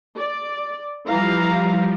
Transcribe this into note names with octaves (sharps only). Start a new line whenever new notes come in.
D5
E3 F3 G3 F5 A#5